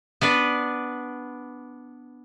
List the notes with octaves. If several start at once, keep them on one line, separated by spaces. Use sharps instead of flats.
B3 D4 B4